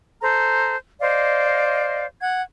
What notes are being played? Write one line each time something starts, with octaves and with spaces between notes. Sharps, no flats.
A4 C5 A#5
C5 D5 D#5 F5
F#5 G#6